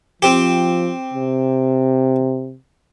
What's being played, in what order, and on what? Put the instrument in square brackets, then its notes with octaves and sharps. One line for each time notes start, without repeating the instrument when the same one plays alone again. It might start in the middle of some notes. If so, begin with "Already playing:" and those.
[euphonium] F3 [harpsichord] C4 G4
[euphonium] C3